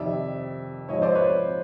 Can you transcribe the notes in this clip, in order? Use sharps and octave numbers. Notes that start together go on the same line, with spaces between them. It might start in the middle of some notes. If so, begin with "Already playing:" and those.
Already playing: F2 C3 D#3 D5 E5
G#2 F3 C#5 D#5
C5 D5
B4 C#5